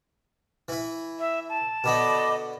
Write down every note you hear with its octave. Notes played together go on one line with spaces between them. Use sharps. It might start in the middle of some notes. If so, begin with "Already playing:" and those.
E3 E4
E5
A5
B2 D3 B3 D#5 B5 D6